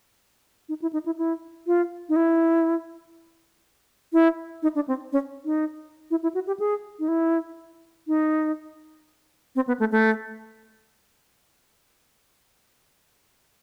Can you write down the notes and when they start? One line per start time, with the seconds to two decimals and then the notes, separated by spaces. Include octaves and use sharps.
0.69 D#4
0.82 E4
0.93 D#4
1.06 E4
1.18 E4
1.67 F4
2.09 D#4
2.16 E4
4.13 E4
4.63 D#4
4.75 D4
4.88 C4
5.12 C#4
5.45 D#4
6.11 E4
6.23 E4
6.34 F#4
6.47 G4
6.60 G#4
6.99 D#4
7.08 E4
8.08 D#4
9.56 C4
9.67 B3
9.80 A3
9.92 A3